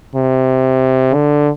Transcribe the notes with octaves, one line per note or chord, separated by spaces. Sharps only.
C3
D3